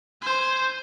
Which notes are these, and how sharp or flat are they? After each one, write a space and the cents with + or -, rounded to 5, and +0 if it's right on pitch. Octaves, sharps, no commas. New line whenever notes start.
C5 +0 G#5 +0